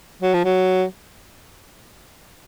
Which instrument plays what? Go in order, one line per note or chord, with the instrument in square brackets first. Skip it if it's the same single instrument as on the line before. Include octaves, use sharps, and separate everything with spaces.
[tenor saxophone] F#3
F3
F#3